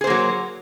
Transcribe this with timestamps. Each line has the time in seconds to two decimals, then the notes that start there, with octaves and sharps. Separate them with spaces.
0.01 G#4
0.04 C5
0.07 A#3
0.10 F#3